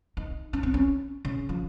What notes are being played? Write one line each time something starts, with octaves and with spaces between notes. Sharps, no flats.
D#4
C#4
C4
C#4
C#3
F3